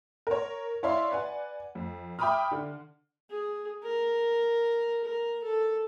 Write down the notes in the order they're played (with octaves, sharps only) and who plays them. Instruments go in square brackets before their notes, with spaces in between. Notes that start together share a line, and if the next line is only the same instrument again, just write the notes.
[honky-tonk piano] A#4 C#5
E4 C#5 D5 E5 F5 C6
B4 D5 F#5 G#5
F2
E5 G5 B5 D6 D#6 F6
D3
[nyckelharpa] G#4
A#4
A#4
A4